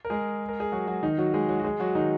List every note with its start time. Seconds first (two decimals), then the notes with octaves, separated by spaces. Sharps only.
0.05 A#4
0.10 G#3 G#4
0.49 A#4
0.60 G#4
0.72 F#3 F#4
0.87 F#3 F#4
1.03 D#3 D#4
1.18 F#3 F#4
1.34 G#3 G#4
1.49 F#3 F#4
1.60 F#4
1.64 G#3 G#4
1.80 F#3 F#4
1.95 D#3 D#4